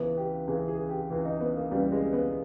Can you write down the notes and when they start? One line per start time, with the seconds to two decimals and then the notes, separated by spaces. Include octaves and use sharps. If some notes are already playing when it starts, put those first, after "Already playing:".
Already playing: C#2 C#3 E3 B3
0.17 G4
0.48 C#2 C#3 E3 G#4
0.68 G#4
0.89 G4
1.10 C#2 C#3 E3
1.25 D#4
1.40 B3
1.57 A#3
1.71 C#2 C#3 E3 G3
1.92 G#3
2.13 B3